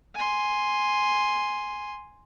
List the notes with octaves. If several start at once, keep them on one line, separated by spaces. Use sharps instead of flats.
G#5 C6